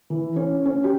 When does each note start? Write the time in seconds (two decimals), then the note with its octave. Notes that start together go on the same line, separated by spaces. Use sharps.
0.10 E3
0.36 C#4
0.66 C#4
0.84 G4